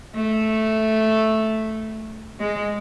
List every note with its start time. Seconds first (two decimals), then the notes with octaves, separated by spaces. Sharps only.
0.15 A3
2.40 G#3